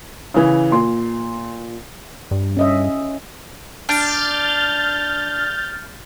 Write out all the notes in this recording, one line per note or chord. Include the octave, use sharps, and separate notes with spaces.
C#3 E3
A#2 C6
G2
C#4 D#5 E5
D4 F6 G6 A6